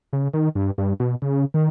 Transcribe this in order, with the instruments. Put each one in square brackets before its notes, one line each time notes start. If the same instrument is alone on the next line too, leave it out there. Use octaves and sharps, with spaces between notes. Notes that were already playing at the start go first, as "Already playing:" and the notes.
[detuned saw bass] C#3
D#3
G2
G2
B2
C#3
D#3